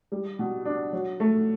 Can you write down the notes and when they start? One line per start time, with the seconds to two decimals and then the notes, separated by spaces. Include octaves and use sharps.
0.12 G3
0.39 B2
0.65 D4
0.93 F#3
1.20 A3